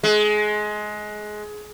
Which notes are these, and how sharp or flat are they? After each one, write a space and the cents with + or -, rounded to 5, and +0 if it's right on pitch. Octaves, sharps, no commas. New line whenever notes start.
G#3 +20